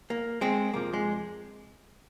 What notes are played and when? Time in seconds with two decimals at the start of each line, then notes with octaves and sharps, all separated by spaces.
0.10 A#3
0.41 G#3 C4
0.73 F2 C3 F3 A#3
0.93 G#3